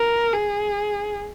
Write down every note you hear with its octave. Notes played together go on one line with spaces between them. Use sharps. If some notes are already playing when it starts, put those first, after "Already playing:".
Already playing: A#4
G#4